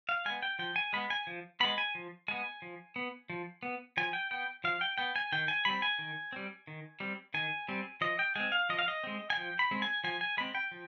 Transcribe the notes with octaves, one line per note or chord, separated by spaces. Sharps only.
F5
G#3 B3 G#5
G5
F3 G5
G#5
G#3 B3 B5
G#5
F3
G#3 B3 B5
G#5
F3
G#3 B3 G#5
F3
B3
F3
B3
F3 G#5
G5
B3 G5
F3 F5
G5
B3 G5
G#5
D#3 G5
G#5
G3 C4 B5
G#5
D#3
G3 C4
D#3
G3 C4
D#3 G#5
G3 C4
F3 D#5
G5
G#3 C4 G#5
F5
F3 D#5
F5
D#5
G#3 C4
G#5
F3 G5
B5
G#3 C4
G#5
F3 G#5
G#5
G#3 C4 B5
G5
F3